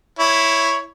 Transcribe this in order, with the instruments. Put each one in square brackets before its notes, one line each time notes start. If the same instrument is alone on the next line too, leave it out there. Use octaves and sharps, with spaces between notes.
[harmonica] E4 C#5